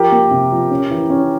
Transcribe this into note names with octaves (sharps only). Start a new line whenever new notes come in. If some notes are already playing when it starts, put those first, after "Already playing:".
Already playing: F3 G4 A#4
A#3
C3
F3
C#4
E3
C#4